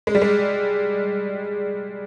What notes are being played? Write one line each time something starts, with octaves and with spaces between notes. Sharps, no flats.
G#3
G3
G#3